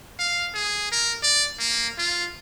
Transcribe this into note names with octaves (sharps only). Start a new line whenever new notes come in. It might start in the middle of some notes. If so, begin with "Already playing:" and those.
F5
G#4
A#4
D5
A#3
F4